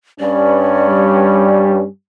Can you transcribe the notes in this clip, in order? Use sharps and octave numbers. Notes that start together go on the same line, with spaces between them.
G2 C#4 D5
G3